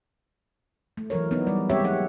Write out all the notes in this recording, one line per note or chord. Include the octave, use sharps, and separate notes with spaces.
A3
E3 F#3 A#4 C#5
B3 D#4
G3 D5
G#3 A#3 C4 G4 C#5 E5
F#3 D#4 C#5 F#5